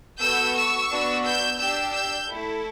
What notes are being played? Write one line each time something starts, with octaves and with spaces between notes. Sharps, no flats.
B3 F#4 A4 E6 G6
C#6 E6
B3 D4 F#4
E6 G6
D4 G4 E6 G6
E6 G6
A3 E4 A4